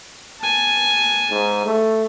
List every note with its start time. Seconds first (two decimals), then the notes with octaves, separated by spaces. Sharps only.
0.41 G#5 A5
1.30 G#2
1.66 A3